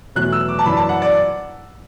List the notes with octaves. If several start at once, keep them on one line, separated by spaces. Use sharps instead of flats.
E2 B2 F#3 A3 F#6
E6
D6
A5
F#2 E3 D4 B5
A5
F#5
D5